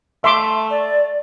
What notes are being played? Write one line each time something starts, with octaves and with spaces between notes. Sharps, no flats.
A3 E5 C6 D6
D5